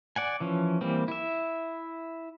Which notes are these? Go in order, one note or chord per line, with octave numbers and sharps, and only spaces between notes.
D5 F#5 G#5
E3 F3 C#4
E3 G3 A#3 C4
E4 E5